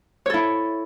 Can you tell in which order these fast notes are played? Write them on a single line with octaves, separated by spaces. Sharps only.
C#5 A4 E4